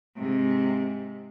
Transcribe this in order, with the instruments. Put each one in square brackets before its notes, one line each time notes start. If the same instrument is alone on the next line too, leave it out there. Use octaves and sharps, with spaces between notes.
[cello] G#2 C3